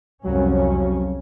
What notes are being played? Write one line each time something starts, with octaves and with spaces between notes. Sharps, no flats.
C2 F2 F#3 C#4